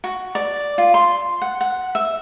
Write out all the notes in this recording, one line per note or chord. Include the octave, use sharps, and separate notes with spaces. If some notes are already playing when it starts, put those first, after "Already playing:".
F#4
D5
F4
C6
F#5
F#5
E5